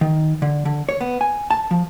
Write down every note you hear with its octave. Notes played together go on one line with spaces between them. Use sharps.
D#3
D3
D3
C#5
B3
G#5
A5
F3